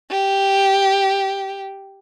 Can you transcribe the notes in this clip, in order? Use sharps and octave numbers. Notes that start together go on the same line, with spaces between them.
G4